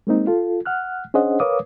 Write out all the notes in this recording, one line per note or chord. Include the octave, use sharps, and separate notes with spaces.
G#3 A#3 C4 D#4
F4 A4
F#5 F6 F#6
C#4 D4 G#4 C5 D#5 F#5
A#4 B4 C#5 F5 D6 D#6